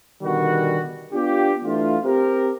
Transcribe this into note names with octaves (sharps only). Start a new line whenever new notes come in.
B2 D3 D#3 G3 F#4
B3 D4 F4 G4
E3 A3 D4 F4
C4 G4 A#4